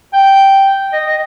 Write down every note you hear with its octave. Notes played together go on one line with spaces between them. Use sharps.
G5
D#5
D#5